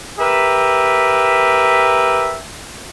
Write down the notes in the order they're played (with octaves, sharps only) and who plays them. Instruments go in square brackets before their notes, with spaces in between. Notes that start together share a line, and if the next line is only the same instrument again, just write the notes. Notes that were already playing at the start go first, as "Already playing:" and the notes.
[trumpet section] G4 A#4 B4 E5